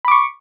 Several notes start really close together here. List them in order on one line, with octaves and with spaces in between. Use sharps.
B5 D6 C#6